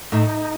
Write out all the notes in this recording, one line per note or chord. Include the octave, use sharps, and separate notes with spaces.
A2 D#4